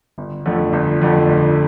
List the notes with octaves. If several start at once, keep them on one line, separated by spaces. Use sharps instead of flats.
G1
F2 D3 A3
G1
F2 D3 A3
G1